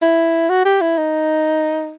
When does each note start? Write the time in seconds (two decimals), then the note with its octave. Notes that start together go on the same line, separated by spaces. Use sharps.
0.02 E4
0.50 F#4
0.65 G4
0.81 E4
0.98 D#4